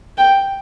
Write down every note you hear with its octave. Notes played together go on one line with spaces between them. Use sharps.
G5